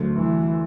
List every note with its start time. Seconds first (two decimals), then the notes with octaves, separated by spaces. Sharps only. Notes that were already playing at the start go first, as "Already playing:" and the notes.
Already playing: D2 D3 F#3 A3
0.17 E3